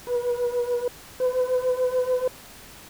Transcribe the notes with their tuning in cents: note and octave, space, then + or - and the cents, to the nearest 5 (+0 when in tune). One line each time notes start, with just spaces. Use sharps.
B4 -30
B4 +40